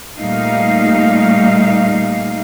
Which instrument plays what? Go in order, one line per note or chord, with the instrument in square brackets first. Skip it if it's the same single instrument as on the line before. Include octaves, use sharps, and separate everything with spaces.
[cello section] A#2 G3 A3 D#4 F5